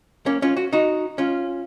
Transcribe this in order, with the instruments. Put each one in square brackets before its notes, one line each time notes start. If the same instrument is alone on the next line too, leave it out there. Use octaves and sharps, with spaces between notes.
[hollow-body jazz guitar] A#3 C#4
C#4 F4
F#4
D#4 F#4
C#4 F4